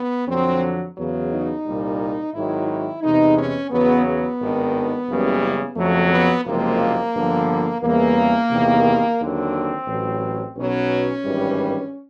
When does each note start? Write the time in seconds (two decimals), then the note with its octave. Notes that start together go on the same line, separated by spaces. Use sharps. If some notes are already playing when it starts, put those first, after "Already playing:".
Already playing: B3
0.28 F2 D3 F#3 C4
0.97 E2 C#3 F#3
1.31 D#4
1.65 C2 A#2 G3
2.34 G#1 G#2 D#3 F#3 E4
2.68 E4
3.02 E2 C3 E3 G#3 D#4
3.36 C#4
3.70 E2 C#3 F#3 B3
4.05 B3
4.39 G#1 G2 D#3
5.08 F#1 F#2 C#3 E3 G3
5.76 F2 C#3 F#3 A3
6.10 B3
6.45 F#1 F2 C3 F3 G#3 A#3
7.13 G1 G2 D3 F3
7.81 E2 C#3 E3 G3 A#3
8.50 E2 C3 D#3 G3
9.19 D#2 D3 F#3 C4
9.88 A1 A2 F#3
10.56 B1 B2 F#3 C#4
11.25 G#1 G2 E3 G3